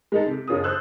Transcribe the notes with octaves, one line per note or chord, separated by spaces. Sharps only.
G#3 D#4 A4
C3
F#1 C#4 F4 G#4 A#4 D#6
A4 C5 E6 F#6